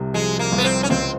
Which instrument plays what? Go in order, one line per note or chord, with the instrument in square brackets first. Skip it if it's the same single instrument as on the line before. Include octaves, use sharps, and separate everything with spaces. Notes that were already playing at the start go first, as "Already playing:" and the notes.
Already playing: [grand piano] C2 C3
[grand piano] F3 [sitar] G#3
[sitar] A#3
[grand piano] C2
[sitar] B3
C4
C#4
[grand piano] C#2 [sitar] C4